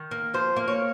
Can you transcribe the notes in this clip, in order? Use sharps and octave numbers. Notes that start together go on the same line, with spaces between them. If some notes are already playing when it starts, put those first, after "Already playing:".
Already playing: D#3
A#3
F3 C5
A#3
C#5